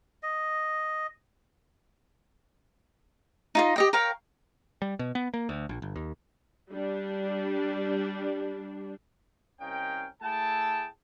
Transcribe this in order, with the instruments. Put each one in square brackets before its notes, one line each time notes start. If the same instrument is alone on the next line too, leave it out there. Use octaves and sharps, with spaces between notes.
[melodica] D#5
[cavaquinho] D#4 F4 D#5
G4 D#5 G5
A#4 C#5 F5 G5
[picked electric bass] G3
B2
B3
A#3
D2
A#1
G1
D#2
[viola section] G3 D4
[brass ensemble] C2 C#4 A#4 D#5 F5 G5
A3 E4 G#4 A4 G5 A5